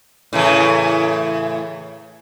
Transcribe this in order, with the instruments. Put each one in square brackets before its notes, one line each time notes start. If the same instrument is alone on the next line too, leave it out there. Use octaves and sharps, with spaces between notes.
[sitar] A2 C#3 E3